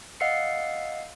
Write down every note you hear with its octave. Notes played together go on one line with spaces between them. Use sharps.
D#5 F5 F#5 E6 C7 C#7